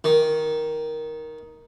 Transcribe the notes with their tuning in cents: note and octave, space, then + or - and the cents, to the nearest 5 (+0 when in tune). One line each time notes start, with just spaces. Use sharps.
D#3 +5